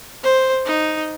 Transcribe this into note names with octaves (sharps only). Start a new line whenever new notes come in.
C5
D#4